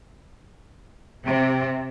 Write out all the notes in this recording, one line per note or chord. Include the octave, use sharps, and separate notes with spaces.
C3